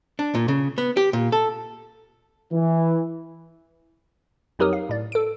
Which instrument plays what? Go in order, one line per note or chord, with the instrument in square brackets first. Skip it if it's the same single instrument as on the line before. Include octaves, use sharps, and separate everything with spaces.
[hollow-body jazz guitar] D4
A#2
C#3
B3
G4
A#2
A4
[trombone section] E3
[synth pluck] F2 F#3 D#4 G4 A#4 D#6
F5
A2 D5
A4 D7